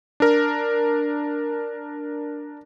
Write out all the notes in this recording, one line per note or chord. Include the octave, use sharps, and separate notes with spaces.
D4 A#4